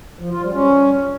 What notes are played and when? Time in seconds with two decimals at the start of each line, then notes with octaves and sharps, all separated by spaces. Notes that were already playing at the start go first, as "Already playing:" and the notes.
0.19 F3
0.30 F4
0.42 G3
0.53 C#4